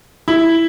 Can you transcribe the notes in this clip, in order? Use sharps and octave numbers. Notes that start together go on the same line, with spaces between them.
E4